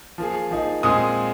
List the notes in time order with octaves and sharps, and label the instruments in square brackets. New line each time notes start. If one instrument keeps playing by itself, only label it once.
[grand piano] F3 A#3 G#4
F3 A#3 D#4 G#4
[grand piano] A#2 G#3 C4 G#4 [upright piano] D#6